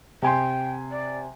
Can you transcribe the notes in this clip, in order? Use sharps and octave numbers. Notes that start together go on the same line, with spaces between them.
C3 G5 G#5 C6
D5